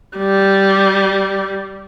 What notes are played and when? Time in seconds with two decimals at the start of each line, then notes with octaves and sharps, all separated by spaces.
0.17 G3